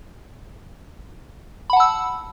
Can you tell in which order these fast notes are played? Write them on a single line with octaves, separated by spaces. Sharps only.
B5 F#5 A5 E6